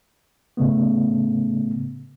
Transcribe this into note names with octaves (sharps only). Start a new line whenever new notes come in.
A2 C#3 A3 B3